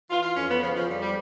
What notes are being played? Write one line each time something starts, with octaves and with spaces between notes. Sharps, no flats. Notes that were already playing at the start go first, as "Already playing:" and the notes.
E3 F4
F4
F2 C#4
B3
C#3 F3
F3
F2 G3
G3